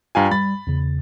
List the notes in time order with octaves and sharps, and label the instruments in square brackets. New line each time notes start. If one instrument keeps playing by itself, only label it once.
[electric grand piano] G2 F5 G#5 [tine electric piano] F4 G5 A#5
[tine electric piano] G3 [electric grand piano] B5 A6
[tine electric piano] E2 C#3